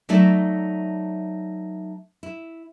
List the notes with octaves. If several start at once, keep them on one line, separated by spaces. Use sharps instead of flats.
F#3 A3 D#4 D5 E5
E4